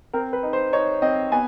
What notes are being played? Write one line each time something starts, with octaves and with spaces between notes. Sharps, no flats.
C4 A#4
B4
D#4
C5
D#4 C#5
C4 D#5
B3 G#5